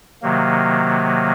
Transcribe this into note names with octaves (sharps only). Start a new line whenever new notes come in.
C3 D#3 F#3 A#3